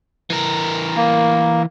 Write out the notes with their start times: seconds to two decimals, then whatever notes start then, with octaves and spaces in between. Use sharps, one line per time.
0.30 E3 A#4
0.96 A#3